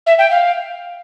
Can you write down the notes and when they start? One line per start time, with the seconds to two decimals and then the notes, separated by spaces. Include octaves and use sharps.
0.06 E5
0.18 G5
0.30 F5